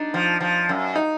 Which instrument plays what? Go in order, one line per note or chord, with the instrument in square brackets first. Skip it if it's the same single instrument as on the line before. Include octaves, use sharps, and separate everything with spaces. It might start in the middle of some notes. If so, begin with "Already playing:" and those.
Already playing: [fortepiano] D4 D#4
[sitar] F3
F3
F#2
[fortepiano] D#4